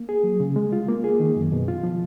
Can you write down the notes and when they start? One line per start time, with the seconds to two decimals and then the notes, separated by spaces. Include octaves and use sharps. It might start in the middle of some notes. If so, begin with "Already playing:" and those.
Already playing: A#3
0.09 G#4
0.24 F#3
0.40 C#3
0.56 G#3
0.73 F4
0.88 A#3
1.04 G#4
1.20 D#3
1.36 F#2
1.52 B2
1.68 F4
1.83 F3